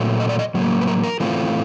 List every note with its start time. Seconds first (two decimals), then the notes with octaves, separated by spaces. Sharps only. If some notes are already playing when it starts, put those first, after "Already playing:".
Already playing: A#2 F#3 A3
0.20 D#5
0.29 D5
0.39 D#5
0.54 A2 F#3 A#3
0.81 B4
0.88 A#4
1.03 A#4
1.20 A2 E3 A3 C4 F4